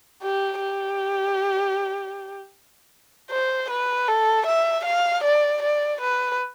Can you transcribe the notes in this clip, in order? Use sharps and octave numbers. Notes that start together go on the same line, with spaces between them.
G4
G4
C5
B4
A4
E5
F5
D5
D5
B4